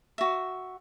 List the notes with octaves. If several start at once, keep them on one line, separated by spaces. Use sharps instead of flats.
F#4 E5